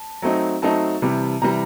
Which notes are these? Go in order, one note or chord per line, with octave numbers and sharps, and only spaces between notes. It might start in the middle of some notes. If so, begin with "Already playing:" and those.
Already playing: A5
F#3 A3 C4 D#4
F#3 A3 C4 D#4 A5
C3 E3 G3
C3 E3 G3 A#5